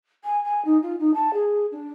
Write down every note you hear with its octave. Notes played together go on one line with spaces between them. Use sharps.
G#5
G#5
D#4
F4
D#4
A5
G#4
D4